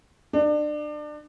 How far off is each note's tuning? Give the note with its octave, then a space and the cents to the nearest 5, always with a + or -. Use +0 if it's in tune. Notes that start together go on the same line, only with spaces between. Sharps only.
D4 +30